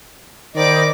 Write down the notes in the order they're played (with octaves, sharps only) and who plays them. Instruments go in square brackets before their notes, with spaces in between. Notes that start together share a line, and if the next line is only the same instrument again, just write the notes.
[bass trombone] D#3 [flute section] C5 D#5 B5 [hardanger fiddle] D5 D6